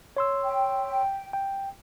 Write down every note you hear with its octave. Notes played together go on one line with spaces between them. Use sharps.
C#5 C6 E6
G5
G5